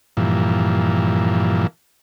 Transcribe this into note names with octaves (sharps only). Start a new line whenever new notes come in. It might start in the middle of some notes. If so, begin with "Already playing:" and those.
G2 A#2 E3 F3